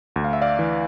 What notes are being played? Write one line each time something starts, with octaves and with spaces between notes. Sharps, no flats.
D2
F5
E5
D5 F5
E3